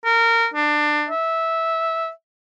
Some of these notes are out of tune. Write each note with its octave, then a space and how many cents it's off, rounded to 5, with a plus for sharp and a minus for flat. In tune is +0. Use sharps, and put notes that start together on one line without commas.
A#4 -20
D4 +20
E5 -10